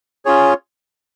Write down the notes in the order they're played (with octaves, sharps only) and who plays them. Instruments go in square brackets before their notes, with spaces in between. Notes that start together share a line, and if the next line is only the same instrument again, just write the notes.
[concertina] C#4 F4 G#4 C#5